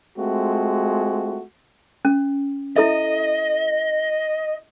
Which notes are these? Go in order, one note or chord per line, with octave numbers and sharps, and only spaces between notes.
G#3 A3 C4 F4 F#4
C#4
E4 A4 D#5 E5